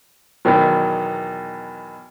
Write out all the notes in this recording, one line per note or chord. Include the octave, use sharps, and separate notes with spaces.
E2 B2 D#3 F#3